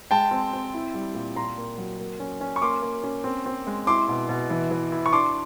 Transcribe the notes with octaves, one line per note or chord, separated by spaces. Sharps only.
G#3 G5 A5
C4
C4
E4
G3
A#2
A#2 A#5 C6
A#3
F#3
A#3
C#4
C#4
C#6
A#3 C6 D6
A#3
C#4
C4
C4
G#3
E4 C6 D6
B2
B2
E3
E3
E4
C#6
D4 C6 D6